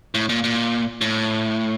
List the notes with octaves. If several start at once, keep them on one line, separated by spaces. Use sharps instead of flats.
A2
A#2
A#2
A2